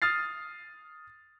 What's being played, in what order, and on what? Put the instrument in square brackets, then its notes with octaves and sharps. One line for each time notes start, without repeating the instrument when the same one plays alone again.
[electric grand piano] D#6 F6 A6 C7